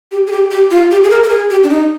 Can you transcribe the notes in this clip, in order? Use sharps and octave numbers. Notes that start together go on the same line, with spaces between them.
G4
G#4
G4
G4
F4
G4
G#4
A#4
A#4
G#4
G4
D4
D#4